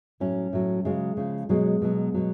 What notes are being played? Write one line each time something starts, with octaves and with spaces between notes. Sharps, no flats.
A2 F#3 C#4
A2 F#3
C#3 F#3 G#3
C#3 F3
B2 F#3 G#3
B2 F#3
B2 F#3